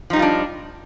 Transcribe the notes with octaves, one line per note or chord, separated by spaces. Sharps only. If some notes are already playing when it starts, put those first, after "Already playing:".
F3 G3 D4 D#4 F4